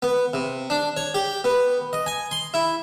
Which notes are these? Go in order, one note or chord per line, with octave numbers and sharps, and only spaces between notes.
B3
C3
D4
C#5
G4
B3
D#5
G#5
C6
E4